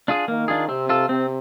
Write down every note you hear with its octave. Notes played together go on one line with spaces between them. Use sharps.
D4 F4 G#4
D#3 A#3
D4 F4 G#4
C3 C4
F4 A4
C3 C4